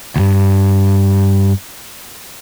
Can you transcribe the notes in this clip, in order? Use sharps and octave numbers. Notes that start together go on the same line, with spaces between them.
D2 G2